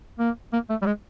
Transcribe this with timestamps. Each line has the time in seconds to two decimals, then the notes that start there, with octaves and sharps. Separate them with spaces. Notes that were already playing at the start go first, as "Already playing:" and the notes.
0.20 A#3
0.53 A#3
0.70 A3
0.82 G3
0.86 G#3